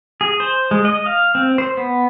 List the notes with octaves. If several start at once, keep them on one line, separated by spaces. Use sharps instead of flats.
G#4
C5
G#3
D#5
F5
C4
C5
B3